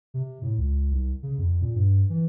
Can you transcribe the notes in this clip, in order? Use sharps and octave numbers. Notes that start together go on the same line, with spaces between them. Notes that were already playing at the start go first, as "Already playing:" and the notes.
C3
A2
C#2
C2
C#3
F2
A#2
G2
E3